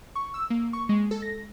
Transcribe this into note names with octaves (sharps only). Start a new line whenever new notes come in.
C#6
E6
A#3
C#6
G#3
A4
A#6